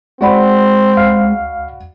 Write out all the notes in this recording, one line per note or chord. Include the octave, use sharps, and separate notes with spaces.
G#3 C4 F#4 D5 B5
C#2 F5